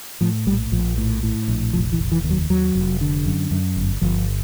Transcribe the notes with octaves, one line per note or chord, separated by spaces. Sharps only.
A2 F3
A#1 G3
A#1 F3
A2
A2
A#1
F1 F3
E3
F1
E3
D#2
F#3
D#2 F#3
F1
D3
F#2
F#2
G1
G1 F3